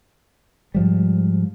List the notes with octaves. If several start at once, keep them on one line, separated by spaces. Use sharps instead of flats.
G#2 F3 G3